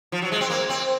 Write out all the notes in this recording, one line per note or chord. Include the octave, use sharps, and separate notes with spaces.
F3
F#3
G#3
C4
A#3
C4